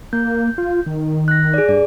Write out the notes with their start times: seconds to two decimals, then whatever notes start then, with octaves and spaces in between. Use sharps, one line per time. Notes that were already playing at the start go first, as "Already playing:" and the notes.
0.13 A#3 G6
0.58 F4
0.86 D#3
1.28 F#6 A#6
1.54 G#4 D5
1.69 G2 D5